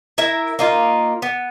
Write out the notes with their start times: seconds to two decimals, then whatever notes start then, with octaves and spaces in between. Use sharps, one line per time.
0.18 E4 A#4 E5
0.59 A#3 D#4 F4
1.22 B3